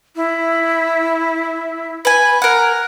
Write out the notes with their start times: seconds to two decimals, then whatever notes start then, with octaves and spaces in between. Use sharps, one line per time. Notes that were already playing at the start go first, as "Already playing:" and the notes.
0.16 E4
2.05 B4 G#5
2.42 A#4 F#5